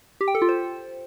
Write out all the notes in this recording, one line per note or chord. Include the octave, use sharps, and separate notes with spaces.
G4
G5
A4
F4
C5